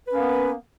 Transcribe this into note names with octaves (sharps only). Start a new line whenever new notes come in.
A#3 B3 C#4 B4